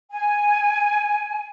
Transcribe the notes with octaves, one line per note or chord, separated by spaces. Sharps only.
G#5